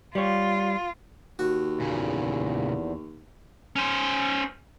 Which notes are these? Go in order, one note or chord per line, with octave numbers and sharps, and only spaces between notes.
G3 F4 G4 C#5
D#2 F#4
E2 A#2 C#3
C#4 C5